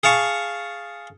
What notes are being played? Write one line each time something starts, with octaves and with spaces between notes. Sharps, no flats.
G#4 F5 A5 C#6